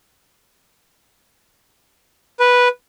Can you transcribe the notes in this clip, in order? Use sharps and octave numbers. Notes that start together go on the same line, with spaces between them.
B4